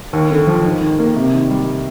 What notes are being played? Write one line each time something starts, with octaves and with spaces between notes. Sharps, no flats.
D#2
D3
F3
G#2
D#3
A#3
C3
D#3
G3